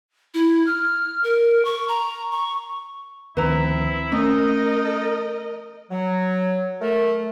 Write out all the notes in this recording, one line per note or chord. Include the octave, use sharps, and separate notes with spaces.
E4
F6
A#4
C#6
A#5
C#6
D2 D#3 F3 C4 E4 B4 A#5
A3 C#4 D#4 A#4 D#5
F#3
A3 A#4